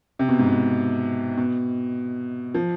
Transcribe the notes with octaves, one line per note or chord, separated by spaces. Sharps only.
C3
B2
G#2
B2
B2
F3